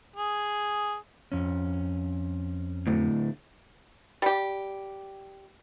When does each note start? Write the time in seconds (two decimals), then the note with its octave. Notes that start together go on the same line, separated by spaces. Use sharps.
0.16 G#4
1.32 F2 C#4
2.87 D2 A2
4.22 G3 G4